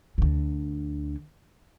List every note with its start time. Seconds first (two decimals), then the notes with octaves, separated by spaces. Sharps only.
0.18 D2 D3